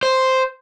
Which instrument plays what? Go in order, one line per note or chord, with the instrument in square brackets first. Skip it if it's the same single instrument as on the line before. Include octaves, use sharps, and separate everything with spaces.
[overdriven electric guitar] C5